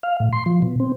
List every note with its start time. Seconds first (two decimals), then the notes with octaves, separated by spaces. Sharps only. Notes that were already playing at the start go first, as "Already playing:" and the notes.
0.03 F5
0.20 A2
0.33 C6
0.46 F3
0.62 B2
0.80 C4